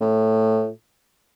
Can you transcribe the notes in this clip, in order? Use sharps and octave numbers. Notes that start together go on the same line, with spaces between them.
A2